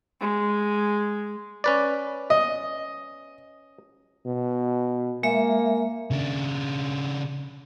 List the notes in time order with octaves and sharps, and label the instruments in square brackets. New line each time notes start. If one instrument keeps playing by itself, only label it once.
[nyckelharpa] G#3
[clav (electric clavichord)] C#4 B4 D5
[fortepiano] D#5
[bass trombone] B2
[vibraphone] G#3 E5 [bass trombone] A#3
[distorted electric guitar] C#3 D4